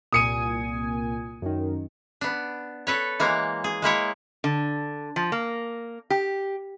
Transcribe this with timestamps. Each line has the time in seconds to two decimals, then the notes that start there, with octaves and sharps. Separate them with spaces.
0.12 C2 A#2 G#5 D#6 C#7 D#7
1.42 F#2 D#3
2.21 B3 D4
2.87 A4 B4 C#5
3.20 E3 G#3 A#3
3.64 G#4
3.82 G#3 A#3 E4 C#5
4.44 D3
5.16 F3
5.32 A#3
6.10 G4